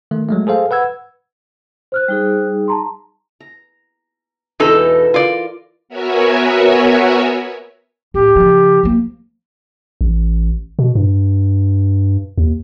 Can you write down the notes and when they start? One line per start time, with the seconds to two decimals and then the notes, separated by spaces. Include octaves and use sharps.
0.11 D#3 A3
0.29 F#3 G#3 A3
0.47 G#4 A4 C5 F5
0.71 B4 F#5 E6 G#6
1.92 C5 F6 F#6
2.08 G3 D#4 G#4
2.68 A5 A#5 C6
3.40 A#5
4.60 E2 B2 E3 G#3 D#4 A4
5.14 F4 A#4 D5
5.89 B3 F#4 A#4 C#5 E5 G#5
8.14 D1 G4
8.36 C#3 F3
8.84 F3 A#3
10.01 A1
10.79 B2
10.95 G2
12.38 D#2